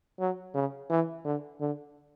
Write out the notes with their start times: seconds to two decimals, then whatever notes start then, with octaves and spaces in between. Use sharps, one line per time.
0.20 F#3
0.55 C#3
0.90 E3
1.25 D3
1.61 D3